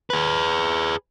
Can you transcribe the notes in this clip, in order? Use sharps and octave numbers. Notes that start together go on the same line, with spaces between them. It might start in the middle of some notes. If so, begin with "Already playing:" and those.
G#4 B4